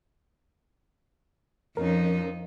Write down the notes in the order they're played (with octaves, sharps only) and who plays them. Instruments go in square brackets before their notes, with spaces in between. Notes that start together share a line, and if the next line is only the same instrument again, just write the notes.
[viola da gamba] F2 D#4 [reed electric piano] C#4 A#4